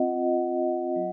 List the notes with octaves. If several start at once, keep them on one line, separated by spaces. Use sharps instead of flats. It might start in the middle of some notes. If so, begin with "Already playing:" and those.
Already playing: C4 F4 D#5 F#5
C4 F4
F#3